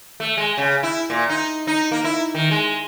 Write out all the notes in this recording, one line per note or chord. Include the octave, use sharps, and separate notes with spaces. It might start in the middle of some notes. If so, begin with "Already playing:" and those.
A3
G#3
C#3
E4
A#2
D#4
D#4
A#3
E4
D#3
G#3